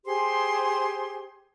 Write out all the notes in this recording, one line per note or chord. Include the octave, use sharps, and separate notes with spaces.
G4 G#4 C5 C6